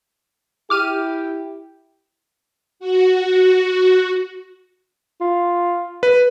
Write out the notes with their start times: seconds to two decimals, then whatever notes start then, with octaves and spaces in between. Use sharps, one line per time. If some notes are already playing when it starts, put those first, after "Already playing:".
0.70 E4 G4 D6 F6 D#7
2.80 F#4
5.21 F4
6.03 B4